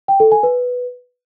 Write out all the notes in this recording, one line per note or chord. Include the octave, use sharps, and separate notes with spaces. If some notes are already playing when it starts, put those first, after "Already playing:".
G5
A4
G#5
B4